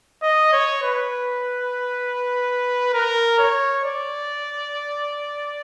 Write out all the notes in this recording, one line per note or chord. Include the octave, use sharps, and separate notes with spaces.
D#5
C#5
B4
A#4
C#5
D5